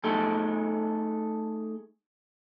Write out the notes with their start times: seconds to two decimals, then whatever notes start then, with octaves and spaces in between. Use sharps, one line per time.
0.04 A3 D#4 G#4 A4